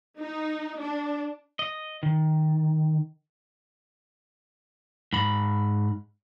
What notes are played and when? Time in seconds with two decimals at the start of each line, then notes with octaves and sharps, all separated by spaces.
0.19 D#4
0.80 D4
1.59 D#5
2.03 D#3
5.13 G#2 B5